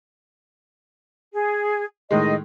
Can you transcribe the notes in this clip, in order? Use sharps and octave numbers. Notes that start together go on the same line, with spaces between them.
G#4
A2 D#3 G#3 D#5